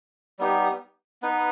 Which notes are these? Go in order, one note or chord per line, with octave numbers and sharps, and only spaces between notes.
G3 B3 D#4 G4
B3 D#4 B4